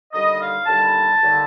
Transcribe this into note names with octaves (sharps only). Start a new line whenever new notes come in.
D#2 D3 G3 D#5
F5
D#2 D3 G3 A5
D#2 D3 G3